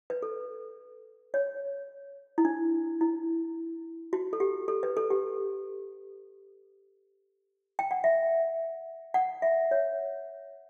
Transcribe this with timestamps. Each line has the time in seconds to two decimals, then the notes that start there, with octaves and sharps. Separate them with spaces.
0.10 B4
0.22 A4
1.34 C#5
2.38 E4
2.45 D4
3.01 E4
4.13 F#4
4.33 A4
4.40 G4
4.68 A4
4.83 B4
4.97 A4
5.10 G4
7.79 G5
7.91 F#5
8.04 E5
9.14 F#5
9.42 E5
9.71 C#5